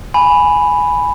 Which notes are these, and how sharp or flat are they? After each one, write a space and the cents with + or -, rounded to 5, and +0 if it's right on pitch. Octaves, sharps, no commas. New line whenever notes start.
G#5 +0 B5 +0